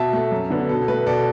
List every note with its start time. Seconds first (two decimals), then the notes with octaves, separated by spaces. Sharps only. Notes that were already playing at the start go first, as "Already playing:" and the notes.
Already playing: B2 E5 A5
0.13 A3
0.32 F#2
0.50 D3 B3
0.69 B2 A4
0.88 A3 B4
1.07 B2 A4 D5